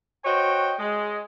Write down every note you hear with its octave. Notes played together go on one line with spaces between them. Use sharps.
F#4 C5 C#5 D#5 G5
G#3